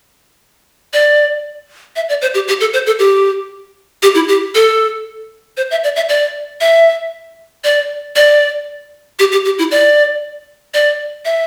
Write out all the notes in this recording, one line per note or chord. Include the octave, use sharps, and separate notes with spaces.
D5
E5
D5
C5
G4
G4
A4
C5
A4
G4
G4
E4
G4
A4
C5
E5
D5
E5
D5
E5
D5
D5
G4
G4
G4
E4
D5
D5
E5